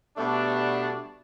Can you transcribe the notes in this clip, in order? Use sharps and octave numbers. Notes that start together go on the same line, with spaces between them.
B2 G3 A3 B3 D4